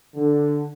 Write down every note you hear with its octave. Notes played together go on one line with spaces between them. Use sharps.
D3